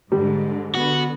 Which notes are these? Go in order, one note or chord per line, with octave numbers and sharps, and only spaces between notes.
G#2 D3 G3
B3 F#4